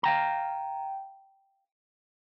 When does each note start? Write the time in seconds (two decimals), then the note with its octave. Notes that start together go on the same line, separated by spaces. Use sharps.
0.03 F5 G5 A#5